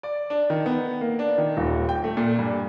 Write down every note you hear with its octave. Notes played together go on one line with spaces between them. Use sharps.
D5
D4
D#3
B3
A#3
D4
D#3
D#1
G5
A3
A#2
G2